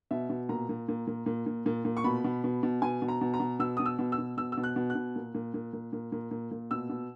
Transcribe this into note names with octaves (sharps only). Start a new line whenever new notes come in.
B2 E5
B2
A#2 A#5
A#2
A#2
A#2
A#2
A#2
A#2
A#2
C#6
B2 B5
B2
B2
B2
B2 G#5
B2
A#5
B2
A#5
B2
B2 E6
B2 D#6
E6
B2
E6
B2
B2 E6
E6
B2
F#6
B2
F#6
B2
A#2
A#2
A#2
A#2
A#2
A#2
A#2
A#2
B2 E6
B2